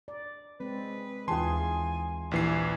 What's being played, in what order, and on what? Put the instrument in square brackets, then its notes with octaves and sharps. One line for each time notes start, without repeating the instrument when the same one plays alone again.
[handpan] D5
[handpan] G#3 C4 [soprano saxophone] B4
[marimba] D#2 A5 [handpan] E3 F4 G#4 [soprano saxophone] G#5 [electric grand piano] C6
[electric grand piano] A#1 E3 C7 [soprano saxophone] G4